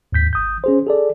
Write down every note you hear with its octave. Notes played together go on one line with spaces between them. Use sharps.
D#2 G#2 G6 B6
G#1 D#6 G6
C#4 G#4 C5
G#4 A4 D5